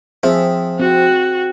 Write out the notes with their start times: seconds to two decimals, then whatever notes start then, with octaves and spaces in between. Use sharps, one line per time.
0.23 F3 C4 G#4 E5
0.80 C4 F#4